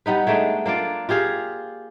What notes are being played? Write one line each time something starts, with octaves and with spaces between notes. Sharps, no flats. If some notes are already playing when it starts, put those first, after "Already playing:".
G3 B3 D#4 B4
G#3 A3 D4 D#4
A#3 D4 F4 D5
F4 G4 G#4 F5